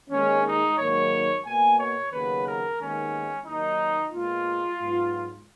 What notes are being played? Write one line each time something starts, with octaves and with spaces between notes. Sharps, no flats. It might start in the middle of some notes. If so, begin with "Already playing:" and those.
D#2 D#3 G#3 C#4
D#4
G#2 D#3 F#3 A#3 C#5
B2 A#3 G#5
C#5
D#2 C#3 F#3 B3 B4
A#4
D#2 D#3 G#3 B3 C#4
D#2 D#3 F#3 D#4
A#2 G#3 B3 F4
G#2 F#3 B3